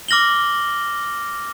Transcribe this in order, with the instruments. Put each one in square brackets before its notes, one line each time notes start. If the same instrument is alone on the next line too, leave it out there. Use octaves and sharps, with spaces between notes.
[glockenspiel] D6 F6 A#6 F#7 G7